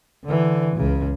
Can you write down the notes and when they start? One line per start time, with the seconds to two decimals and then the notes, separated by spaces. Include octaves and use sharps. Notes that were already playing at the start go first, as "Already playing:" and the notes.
0.25 D3 E3
0.76 C#2 C#3